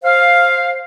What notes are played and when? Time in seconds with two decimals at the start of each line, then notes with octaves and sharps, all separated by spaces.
0.03 C5 F5